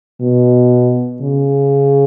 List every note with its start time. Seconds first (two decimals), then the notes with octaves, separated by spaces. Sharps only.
0.20 B2
1.21 C#3